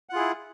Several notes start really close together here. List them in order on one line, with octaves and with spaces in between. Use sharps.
F#5 F4 G#4 E4